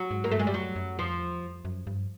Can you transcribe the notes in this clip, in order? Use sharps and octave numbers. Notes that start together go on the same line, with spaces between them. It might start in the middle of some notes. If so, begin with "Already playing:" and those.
Already playing: F#3
G#2
A#3
G2 A3
G#3
G3
F#2 F#3
F#2
F2 F3
E2
F2
F#2
G2